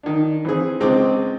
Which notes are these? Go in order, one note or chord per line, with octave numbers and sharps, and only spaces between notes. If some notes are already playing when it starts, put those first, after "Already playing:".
D#3 D4
E3 C4 G#4
C#2 G#3 C4 D6